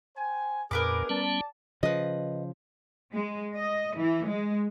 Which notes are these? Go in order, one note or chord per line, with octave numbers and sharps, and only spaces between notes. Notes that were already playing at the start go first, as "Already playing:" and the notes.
C5 G5 G#5
F2 A#2 B3 D4 G#4 A#4 B4 D6
G3 B3 C#4 D5 A5
C#3 F3 B4 D#5
G#3
D#5
E3
G#3